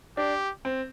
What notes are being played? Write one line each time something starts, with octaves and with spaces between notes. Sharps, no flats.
D4 G4
C4